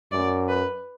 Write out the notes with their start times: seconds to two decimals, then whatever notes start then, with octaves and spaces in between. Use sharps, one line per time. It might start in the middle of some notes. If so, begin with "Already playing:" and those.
0.12 F#2 D5
0.49 B4